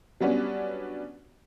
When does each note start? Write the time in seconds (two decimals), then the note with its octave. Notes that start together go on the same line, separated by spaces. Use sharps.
0.21 F#3 G3 B3 C#4 D4